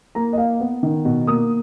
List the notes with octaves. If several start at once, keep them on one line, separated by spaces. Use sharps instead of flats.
A#3 A#5
D#5
A#3 F5
B3
D#3
B2
A#3 D#6